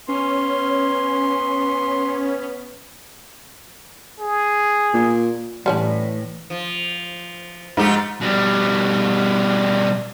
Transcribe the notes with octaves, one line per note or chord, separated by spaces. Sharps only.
B3 C#4 C6
G#4
A#2
A2 E3 G3 C#4 D4
F3
G#2 F3 A3 G4
B2 G3